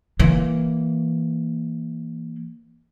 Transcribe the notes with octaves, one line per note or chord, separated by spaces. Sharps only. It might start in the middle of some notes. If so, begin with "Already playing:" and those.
E3 A#3